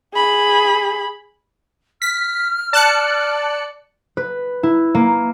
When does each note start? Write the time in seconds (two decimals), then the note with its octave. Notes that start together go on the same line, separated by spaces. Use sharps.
0.14 G#4 B5
2.02 F6 B6
2.73 D5 A5 F#6 C#7
4.17 B4
4.63 E4
4.95 A#3